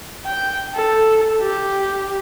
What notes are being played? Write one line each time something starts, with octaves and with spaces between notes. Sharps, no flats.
G5
A4
G4